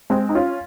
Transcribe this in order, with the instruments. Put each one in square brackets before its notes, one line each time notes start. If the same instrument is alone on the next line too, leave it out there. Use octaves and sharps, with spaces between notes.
[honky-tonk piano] G#3 C4
D#4
C#4 F4